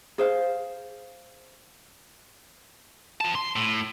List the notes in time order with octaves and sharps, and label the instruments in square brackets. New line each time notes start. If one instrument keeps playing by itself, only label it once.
[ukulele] G#4 C5 F5
[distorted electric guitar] C4 A5
C6
A2